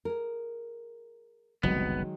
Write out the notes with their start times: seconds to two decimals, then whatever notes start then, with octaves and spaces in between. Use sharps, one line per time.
0.05 G#4 A#4
1.63 F#1 C2 D#3 F#3 G#3 B3